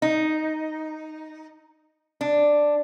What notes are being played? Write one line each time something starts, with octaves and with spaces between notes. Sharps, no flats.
D#4
D4